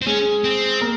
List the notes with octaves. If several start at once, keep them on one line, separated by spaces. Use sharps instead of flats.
C4
G#3 C#4 G#4
C4
A#3 A#4